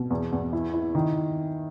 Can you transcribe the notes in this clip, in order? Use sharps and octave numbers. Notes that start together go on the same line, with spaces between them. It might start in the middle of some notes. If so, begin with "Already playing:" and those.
Already playing: B2
E2
E2
E4
E4
D#3